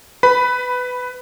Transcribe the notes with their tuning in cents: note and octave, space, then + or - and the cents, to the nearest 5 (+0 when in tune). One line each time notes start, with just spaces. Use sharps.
B4 +15 B5 +0